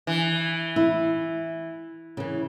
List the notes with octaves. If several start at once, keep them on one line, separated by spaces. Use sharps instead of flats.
E3
E4
C#3 E3